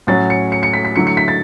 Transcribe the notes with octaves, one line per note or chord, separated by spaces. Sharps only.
A2 F#3 C#4 F#4 A6
C#7
C#7
C#7
B6
B6
D3 F#3 A3 E4 C#7
C#7
B6
A6